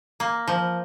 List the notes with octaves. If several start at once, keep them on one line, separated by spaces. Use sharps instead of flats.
A#3
F3